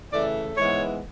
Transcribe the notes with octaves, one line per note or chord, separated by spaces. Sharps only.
C#3 E3 A3 D5
G#2 E3 G#3 B3 C#5